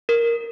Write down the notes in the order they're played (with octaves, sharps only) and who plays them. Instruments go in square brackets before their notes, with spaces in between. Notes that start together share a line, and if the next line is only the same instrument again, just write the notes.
[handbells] A#4